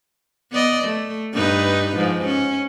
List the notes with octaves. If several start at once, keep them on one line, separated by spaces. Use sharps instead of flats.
B3 D5 D#5
A3
G2 D#4 B4
G#2 F3
C#4